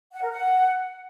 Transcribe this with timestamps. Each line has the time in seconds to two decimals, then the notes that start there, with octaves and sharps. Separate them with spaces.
0.13 F#5
0.22 A#4
0.31 F#5